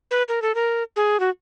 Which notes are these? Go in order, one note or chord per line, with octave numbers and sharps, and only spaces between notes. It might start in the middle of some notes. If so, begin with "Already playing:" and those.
B4
A#4
A4
A#4
G#4
F#4